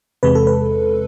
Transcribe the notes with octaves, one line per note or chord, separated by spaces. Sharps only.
E2 C3 G#3 B4
A4
B4